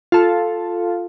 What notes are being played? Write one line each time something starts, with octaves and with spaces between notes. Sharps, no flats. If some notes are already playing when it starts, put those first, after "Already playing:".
F4 A4